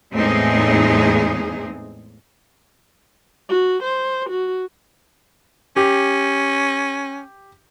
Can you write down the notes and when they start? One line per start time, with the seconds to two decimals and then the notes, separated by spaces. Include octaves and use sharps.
0.13 E2 A2 G#3 C4 D#4 G#4
3.49 F#4
3.83 C5
4.29 F#4
5.76 C#4 G4